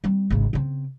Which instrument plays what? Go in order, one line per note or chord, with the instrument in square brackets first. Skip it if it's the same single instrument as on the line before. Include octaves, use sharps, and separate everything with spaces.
[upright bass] G3 C4
G#1 C#3
C#3 C4